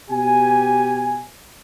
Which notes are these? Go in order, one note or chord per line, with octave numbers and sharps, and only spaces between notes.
B2 G4 G#5